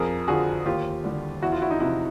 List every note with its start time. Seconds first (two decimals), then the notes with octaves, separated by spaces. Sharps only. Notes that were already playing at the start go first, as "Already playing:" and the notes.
Already playing: F2 G#4 A#4
0.28 D3 F3 F#4 G#4
0.66 D#2 F4 G4
1.04 D3 G3
1.42 E2 E4 F#4
1.52 F4
1.62 E4 F#4
1.70 D#4
1.80 C3 F3 E4